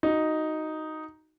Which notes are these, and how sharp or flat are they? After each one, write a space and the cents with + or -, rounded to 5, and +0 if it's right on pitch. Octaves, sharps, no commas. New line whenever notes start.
D#4 +0 F#4 +0